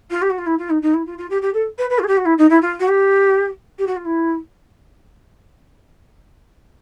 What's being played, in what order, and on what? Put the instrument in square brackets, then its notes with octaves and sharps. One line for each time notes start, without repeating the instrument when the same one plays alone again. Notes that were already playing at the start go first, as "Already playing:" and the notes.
[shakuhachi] F4
G4
F#4
F4
E4
F4
D#4
D#4
E4
F4
F4
G4
G4
A4
B4
B4
F4
G#4
G4
F#4
E4
D#4
E4
F4
F#4
G4
G4
F#4
F4
E4